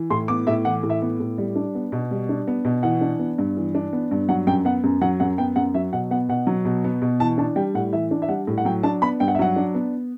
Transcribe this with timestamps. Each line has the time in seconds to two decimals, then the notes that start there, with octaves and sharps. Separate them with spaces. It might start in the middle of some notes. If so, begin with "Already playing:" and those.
Already playing: E3
0.10 A2 C6
0.28 B3 D6
0.47 A2 E5
0.65 E3 F#5
0.83 A2
0.90 E5
1.02 B3
1.20 A2
1.38 G3
1.56 D4
1.75 B3
1.92 B2
2.11 G3
2.29 D4
2.47 B3
2.65 B2
2.83 E3 F#5
3.01 D4
3.19 B3
3.38 G2
3.57 E3
3.75 D4
3.93 B3
4.11 G2
4.29 F#3 F#5
4.47 F#2 G5
4.65 B3 F#5
4.84 F#2
5.01 F#3 F#5
5.20 F#2 F#5
5.38 B3 G5
5.56 F#2 F#5
5.74 F#3 E5
5.93 B2 F#5
6.11 B3 F#5
6.29 B2 F#5
6.47 F#3
6.65 B2
6.84 B3
7.02 B2
7.20 E3 A5
7.38 D4 A5
7.56 G3 G5
7.74 A2 F#5
7.92 E3 E5
8.11 D4
8.22 E5
8.29 G3 F#5
8.47 A2
8.58 F#5
8.65 F#3 G5
8.83 D4 A5
9.02 B3 B5
9.20 G2 G5
9.28 F#5
9.35 E5
9.39 F#3 F#5
9.56 D4
9.75 B3